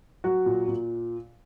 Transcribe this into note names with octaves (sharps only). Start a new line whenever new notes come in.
F#3 F#4
A#2
A#2